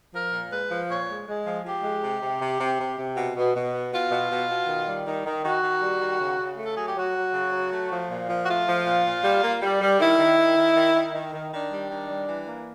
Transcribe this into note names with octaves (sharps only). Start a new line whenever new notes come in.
F3 A#4
A#2
G#3 B4
F3
A#2 C#5
G#3
G#3
F3
F3 G4
G#3
C3
C3
C3
C3
C3
C3
B2
B2
B2
B3
B2 F4
B2
B2
B2
D#3
G3
D#3
D#3
D#3 F#4
D#3
G3
D#3
C#3
C#3
A3 A4
F#3 G#4
G4
F#3 F#4
F#3
C#3
F#3
A3
F3
A#2
F3
F#4
A3 F4
F3
A#2
A#2
G3
A#3
G3
G3
D#3 E4
D#3
D#3
D#3
D#3
D#3
D#3
D#3
D#3 D4
G3
D#3
G3
E3
A#3